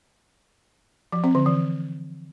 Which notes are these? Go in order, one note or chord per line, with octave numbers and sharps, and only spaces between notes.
F3
C4
D3
E3